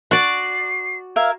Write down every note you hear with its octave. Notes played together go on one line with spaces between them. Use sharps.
F#4 D5 C7
A#4 E5 F5 G#6